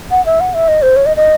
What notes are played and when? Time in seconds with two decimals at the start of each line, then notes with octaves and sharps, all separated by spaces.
0.11 F#5
0.26 E5
0.40 F#5
0.54 E5
0.68 D#5
0.82 C5
0.96 C#5
1.06 D#5
1.17 D#5